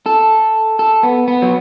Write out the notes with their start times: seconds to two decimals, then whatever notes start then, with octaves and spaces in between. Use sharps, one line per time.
0.06 A4
0.79 A4
1.03 B3
1.28 B3
1.42 F#3